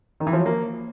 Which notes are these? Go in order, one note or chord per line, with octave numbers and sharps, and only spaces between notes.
D#3
E3
F3
F#3
A#3